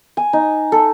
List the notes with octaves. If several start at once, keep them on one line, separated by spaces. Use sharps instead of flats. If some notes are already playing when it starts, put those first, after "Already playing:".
G#5
D#4
A4